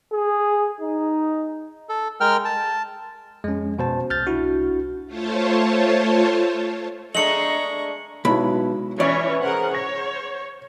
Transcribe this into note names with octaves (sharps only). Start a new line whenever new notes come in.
G#4
D#4
A4
G#3 A#4 G5 F6
A5
F2 G#3 C#4
B2 C5 A5
C2 F6 G6 A6
D4 E4 F#4
A3 F4 C5 C#5 A5
G#3 A3 D4 D#5 A#5 C#6 C#7 F#7
B1 G#3 E4 F#4 B5
E3 C#4 C#5 D5 E5 C#6
G#4 A#4 C5 F#5
C#5 A#6